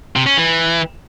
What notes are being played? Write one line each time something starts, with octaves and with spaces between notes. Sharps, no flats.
C3
C#4
E3